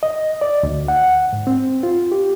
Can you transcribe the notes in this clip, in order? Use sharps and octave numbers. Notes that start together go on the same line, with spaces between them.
D#5
D5
D2
F#5
G#2
C4
F4
G4